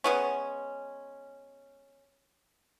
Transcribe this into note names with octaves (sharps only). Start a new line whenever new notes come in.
G#3 B3 C#4